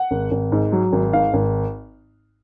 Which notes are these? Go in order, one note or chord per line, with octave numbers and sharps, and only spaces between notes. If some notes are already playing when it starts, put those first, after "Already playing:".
Already playing: F#5
G#1
G#1
G#2
F#3
G#1
G#2 F5
G#1